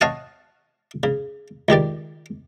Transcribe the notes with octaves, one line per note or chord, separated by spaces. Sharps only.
C#5 D#5 F5 F#5 A5 D#6
C#3
C#2 D#3 G4 D5